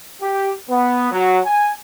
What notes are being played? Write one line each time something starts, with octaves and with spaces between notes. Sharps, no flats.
G4
B3
F#3
G#5